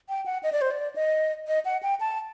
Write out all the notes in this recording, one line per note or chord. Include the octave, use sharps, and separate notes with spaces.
G5
F#5
D#5
D5
C5
D5
D#5
D#5
F#5
G5
A5